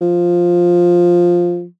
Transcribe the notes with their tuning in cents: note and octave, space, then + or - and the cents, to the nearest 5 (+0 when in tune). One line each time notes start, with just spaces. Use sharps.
F3 +5